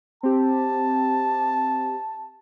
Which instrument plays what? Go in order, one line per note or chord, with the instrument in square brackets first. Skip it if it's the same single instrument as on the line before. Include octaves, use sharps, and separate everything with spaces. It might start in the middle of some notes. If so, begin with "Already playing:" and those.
[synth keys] C4 G4 [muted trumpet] A5